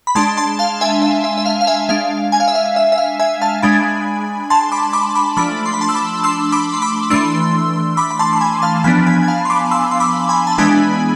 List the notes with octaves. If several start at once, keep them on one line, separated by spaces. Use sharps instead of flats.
B5
G#3 D4 A5 C6
A5 C6
F5 A5
E5 G#5
E5
E5
E5
F5
F5
E5 G#5
G#3 D4 F5
G#5
F5
E5
F5
E5
E5
F5
E5 G#5
F5 A5
G#3 D4 G#5 B5
A5 C6
B5 D6
B5 D6
B5 D6
F3 A3 D4 B5 D6
C6
B5
A5 C6
E6
B5 D6
C6 E6
B5 D6
C6
B5 D6
E3 A3 D4 C6 E6
B5 D6
B5
A5 C6
C6
G#5 B5
F5 A5
F3 B3 D4 G#5 B5
G#5 B5
G#5
F5 A5
C6
B5 D6
C6 E6
C6
B5 D6
G#5 B5
A5
E3 G#3 B3 D4 G#5 B5